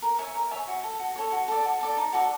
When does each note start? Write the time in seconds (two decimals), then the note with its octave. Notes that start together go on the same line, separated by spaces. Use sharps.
0.02 A#4
0.18 C#5 E5 G#5
0.35 A#4
0.51 C#5 E5 G#5
0.67 F#4
0.83 A4 C#5
0.99 F#4
1.16 A4 C#5
1.32 F#4
1.48 A4 D5
1.65 F#4
1.81 A4 D5
1.97 D#4
2.13 F#4 A4 D5